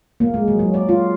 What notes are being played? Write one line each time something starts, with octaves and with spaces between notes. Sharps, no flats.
A#3
G#3
F#3
F#3
D5
F4